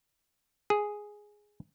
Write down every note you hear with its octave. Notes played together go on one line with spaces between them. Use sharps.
G#4